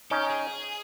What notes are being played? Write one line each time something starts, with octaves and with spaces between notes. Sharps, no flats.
C#4 D#4 G4
G#4